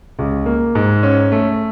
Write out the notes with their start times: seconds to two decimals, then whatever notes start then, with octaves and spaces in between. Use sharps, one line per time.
0.19 C#2
0.46 A#3
0.75 G#2
1.03 C#4
1.32 A3